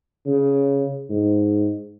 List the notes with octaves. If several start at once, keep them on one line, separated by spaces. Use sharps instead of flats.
C#3
G#2